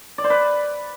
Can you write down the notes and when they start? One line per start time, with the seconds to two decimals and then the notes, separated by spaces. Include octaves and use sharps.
0.18 D5
0.24 C5
0.30 B4